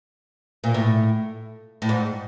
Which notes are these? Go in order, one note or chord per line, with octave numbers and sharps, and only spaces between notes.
A#2
A2
A2
G#2